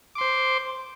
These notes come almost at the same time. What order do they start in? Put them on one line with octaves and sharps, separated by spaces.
D6 C6 C5